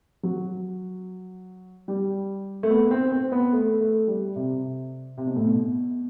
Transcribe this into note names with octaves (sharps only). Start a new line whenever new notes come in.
F#3
G3
A3
B3
C4
C4
B3
A3
A3
G3
C3
C3
B2
A2
B2